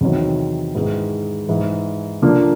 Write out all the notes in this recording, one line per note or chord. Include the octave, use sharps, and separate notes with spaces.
E2 C3 D#3 F#3
G#2 D#3 G#3 B3 E4
G#2 E3 G#3
D3 F3 A#3 D4 F4